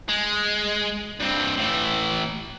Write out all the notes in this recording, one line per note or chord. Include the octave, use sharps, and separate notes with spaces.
G#3
G2 C4
A2 E3